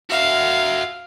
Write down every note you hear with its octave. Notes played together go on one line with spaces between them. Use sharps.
F#4 E5 F5